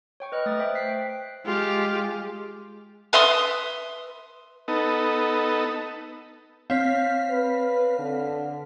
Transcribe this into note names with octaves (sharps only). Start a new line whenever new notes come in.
C#5 G5 C#6
B4 D#5 F6 F#6
A3 D#6 F#6 A6
C5 E5 G5
F#6 B6 C7
G5
G#3 F4 G4
B4 E5 C6 D#6
B3 D#4 A4
C4 C#5 F5 F6 B6
B4
D3